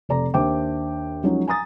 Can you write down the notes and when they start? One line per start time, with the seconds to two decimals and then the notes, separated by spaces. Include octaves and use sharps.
0.09 F1 A4 D5 A#5
0.34 D#2 D4 C5 E5 G5 D6
1.23 F3 F#3 G#3 C#4 D#4
1.47 G#5 A#5 D#6 A6